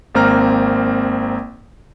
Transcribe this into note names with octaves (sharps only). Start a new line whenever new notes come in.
G#1 A#3 C4 A#5 F6